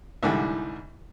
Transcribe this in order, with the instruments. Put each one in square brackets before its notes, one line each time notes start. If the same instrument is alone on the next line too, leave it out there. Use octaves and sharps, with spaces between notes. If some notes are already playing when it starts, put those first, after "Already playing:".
[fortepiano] C2 G#2 D3 E3 G3 A4